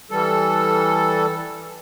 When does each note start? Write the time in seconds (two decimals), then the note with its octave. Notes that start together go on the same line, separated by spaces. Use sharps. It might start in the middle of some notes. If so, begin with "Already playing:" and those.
0.11 E3 G3 A4